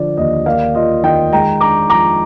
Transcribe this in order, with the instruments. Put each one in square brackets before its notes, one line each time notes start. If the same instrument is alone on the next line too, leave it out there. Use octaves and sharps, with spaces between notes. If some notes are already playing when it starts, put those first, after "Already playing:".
Already playing: [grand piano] D3 F3 D5
D#2 D#5
A#3 D5 F5
F4 D#5
D#3 D#5 G5
G#3 G5 A#5
D4 A#5 D6
F3 A#5 D6